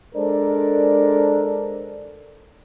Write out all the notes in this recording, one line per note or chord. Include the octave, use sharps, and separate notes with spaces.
G#3 D4 A4 A#4 C5 D5